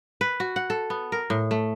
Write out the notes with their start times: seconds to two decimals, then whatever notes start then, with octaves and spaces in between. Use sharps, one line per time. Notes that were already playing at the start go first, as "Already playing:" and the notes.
0.21 B4
0.40 F#4
0.56 F#5
0.70 A4
0.90 B3
1.12 A#4
1.30 A2
1.51 A3